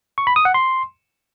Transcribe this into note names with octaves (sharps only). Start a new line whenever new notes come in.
C#6
B5
D#6
F#5
C6